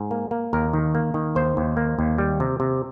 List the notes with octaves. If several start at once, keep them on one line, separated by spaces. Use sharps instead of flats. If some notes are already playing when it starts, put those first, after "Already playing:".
Already playing: G#2
A#3
A#3
D#2 A#4
D#3
A#3
D#3
D#2 C5
D#2
A#3
D#2
G3
C3
C3